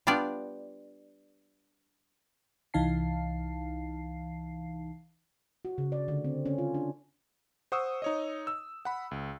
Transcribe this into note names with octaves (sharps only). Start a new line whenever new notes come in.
G3 B3 D4 F4 D5
C2 E3 D#4 F5 A5 C7
F#4
C#3
D5
D3
C4
C#4
F4
D4
C5 F#5 C#6 D#6 E6
D#4 C#5 D#5
E6
F#5 B5
C#2